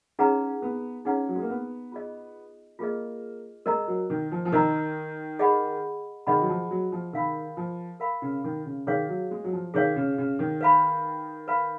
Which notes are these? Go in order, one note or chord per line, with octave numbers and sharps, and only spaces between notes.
C#4 D#4 G#4 B4 F#5 A#5
B3
C#4 D#4 G#4 B4 F#5 A#5
F#3
G#3
A#3
B3
F4 G#4 D#5
A#3 F4 G#4 D#5
G#3 A#4 D#5 A#5
F#3
D#3
F3
F3
D#3 A#4 D#5 A#5
G#4 D#5 F#5 B5
D#3 G#4 D#5 F#5 B5
F#3
F3
F#3
F3
D#3 A#4 F5 B5
F3
A#4 F5 B5
C#3
D#3
C#3
D#3 G#4 C#5 F5
F#3
G#3
F#3
F3
D#3 G#4 C#5 F5
C#3
C#3
D#3
B4 F5 B5
B4 F5 B5